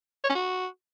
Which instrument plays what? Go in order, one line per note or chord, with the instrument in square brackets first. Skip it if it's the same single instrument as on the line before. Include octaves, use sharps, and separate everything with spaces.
[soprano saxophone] C#5
C#4
F#4